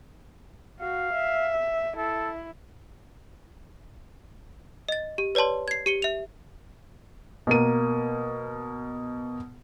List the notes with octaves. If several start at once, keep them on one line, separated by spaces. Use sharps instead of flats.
F#4 F5
E5
E4 A4
D#5 A6
G4
B4 C#5 D5 A5 C6
G#6 C7
G4 C#7 G7
E5 F7
B2 A#3 D#7